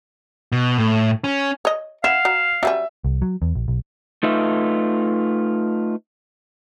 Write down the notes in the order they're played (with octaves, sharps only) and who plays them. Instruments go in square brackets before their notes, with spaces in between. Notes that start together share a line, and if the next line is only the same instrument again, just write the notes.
[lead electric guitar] B2
A2
C#4
[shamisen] C#5 D#5
[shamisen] E4 [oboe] F5 [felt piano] F#5 B6 E7
[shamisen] F#3
[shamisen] F#3 G3 C#4 [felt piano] E5
[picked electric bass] C2
F#3
E2
A#1
B1
[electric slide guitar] A3 D#4 F4 B4 E5